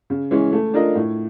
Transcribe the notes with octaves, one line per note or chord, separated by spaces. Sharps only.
C#3
E3 G#3 C#4
A3
D4 F4 A#4 D#5
A2